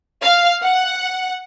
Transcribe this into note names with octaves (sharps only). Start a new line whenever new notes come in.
F5
F#5